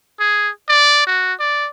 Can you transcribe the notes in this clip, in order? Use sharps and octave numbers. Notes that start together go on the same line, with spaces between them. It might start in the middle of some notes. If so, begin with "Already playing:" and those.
G#4
D5
F#4
D5